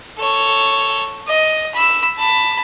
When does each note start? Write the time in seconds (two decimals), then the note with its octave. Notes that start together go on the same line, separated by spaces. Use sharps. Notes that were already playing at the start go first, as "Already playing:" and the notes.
0.18 A4 C#5
1.28 D#5
1.75 B5 E6
2.18 A5 B5